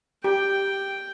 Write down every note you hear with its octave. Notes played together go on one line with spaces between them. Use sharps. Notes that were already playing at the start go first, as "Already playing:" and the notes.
G4 G5